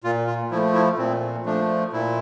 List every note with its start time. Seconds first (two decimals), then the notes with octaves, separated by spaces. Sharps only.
0.04 A#2 F4
0.27 F4
0.51 F3 A3 E4
0.74 E4
0.98 A#2 C4
1.46 F3 A3 D4
1.93 A#2 E4